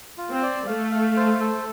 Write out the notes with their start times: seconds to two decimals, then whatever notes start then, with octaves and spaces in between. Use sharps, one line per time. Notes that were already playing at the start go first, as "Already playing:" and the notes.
0.18 F4
0.31 C4
0.42 D5
0.67 A3 F5
0.91 F5
1.16 C5
1.40 A4